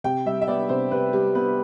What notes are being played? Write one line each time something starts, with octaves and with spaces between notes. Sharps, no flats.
C3 G5
G3 E5
E5
B3 D5
C3 C5
C3 B4
G3 G4
B3 B4